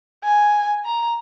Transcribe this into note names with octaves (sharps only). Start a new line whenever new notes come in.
G#5
A#5